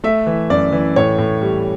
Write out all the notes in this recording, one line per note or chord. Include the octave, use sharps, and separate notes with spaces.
A3 E5
E3
F#2 D5
E3
A2 C#5
A2
G3